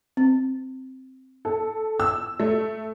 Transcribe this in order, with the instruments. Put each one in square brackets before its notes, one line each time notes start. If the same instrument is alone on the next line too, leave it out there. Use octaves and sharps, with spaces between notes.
[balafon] C4
[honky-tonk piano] A4
E6
A3